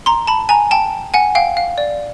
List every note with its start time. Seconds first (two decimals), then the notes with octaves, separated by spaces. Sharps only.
0.06 A#5 C6
0.27 A5 B5
0.49 G#5 A#5
0.71 G5 A5
1.14 F#5 G#5
1.35 F5 G5
1.57 F5
1.78 D5